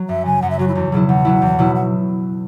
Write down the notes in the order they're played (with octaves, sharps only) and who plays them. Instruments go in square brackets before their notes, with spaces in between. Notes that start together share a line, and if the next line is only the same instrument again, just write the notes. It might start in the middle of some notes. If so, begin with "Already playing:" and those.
Already playing: [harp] F#3
[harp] F#2 [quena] E5
[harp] C#3 F#3 [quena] G#5
[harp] F#2 [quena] F#5
[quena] E5
[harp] C#3 F#3 [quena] F#4
[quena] E4
[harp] E2 [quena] F#4
[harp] B2 F#3 E4 [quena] G#4
[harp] E2 [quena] F#5
[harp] B2 F#3 E4
E2
B2 F#3 E4
[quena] F#5